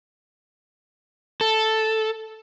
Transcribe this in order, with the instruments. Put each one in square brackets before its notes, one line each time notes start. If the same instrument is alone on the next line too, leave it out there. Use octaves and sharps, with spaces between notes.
[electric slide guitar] A4